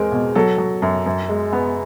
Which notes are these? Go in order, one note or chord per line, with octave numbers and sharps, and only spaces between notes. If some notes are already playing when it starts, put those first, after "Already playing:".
Already playing: E2 G#3 C4 A#4
B2
F#3 A4
F#3
F#2
F#2
G#3
B3